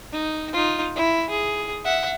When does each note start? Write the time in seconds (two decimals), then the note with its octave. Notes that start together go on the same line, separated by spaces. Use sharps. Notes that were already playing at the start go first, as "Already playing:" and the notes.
0.12 D#4
0.53 D#4 F4
0.96 E4
1.30 G#4
1.85 E5 F#5